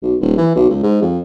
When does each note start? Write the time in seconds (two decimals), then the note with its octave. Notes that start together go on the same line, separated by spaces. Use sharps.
0.03 B1
0.21 D#1
0.37 E3
0.56 B1
0.70 C#2
0.83 G#2
1.02 F2